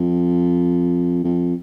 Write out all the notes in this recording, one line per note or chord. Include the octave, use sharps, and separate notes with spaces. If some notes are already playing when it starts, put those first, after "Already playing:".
Already playing: F2
F2